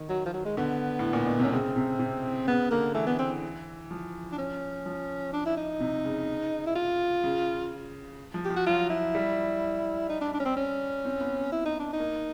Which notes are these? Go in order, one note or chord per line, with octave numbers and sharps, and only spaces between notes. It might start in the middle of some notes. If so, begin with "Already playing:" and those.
Already playing: D#3
F#3
F3
F#3
G#3
D3 B3
A2
A#2
B2
C3 C#4
C#3 C4
C3
C3
C#3 B3
D3 A#3
E3 A3
B3
C4
F3
D4
C#4
F3
D4
E4
D#4
C3
C#3
E4
F4
C#3
F3
G4
F3
F#4
F#3 F4
E4
G3
D#4
D4
D4
C#4
C4
C#4
C4
B3
E4
D#4
D4
D#4
A#3